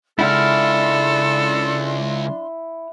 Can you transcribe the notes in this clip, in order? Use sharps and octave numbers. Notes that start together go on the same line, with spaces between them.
C#3 G#3 D4 E4 A4 F#5 C6 F6